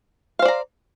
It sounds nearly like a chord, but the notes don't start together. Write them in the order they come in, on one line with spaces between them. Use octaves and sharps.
F5 C5 D5 A#5